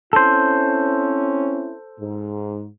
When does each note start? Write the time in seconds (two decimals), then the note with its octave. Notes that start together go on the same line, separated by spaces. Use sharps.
0.13 C4 C#4 E4 A4 C5
2.00 G#2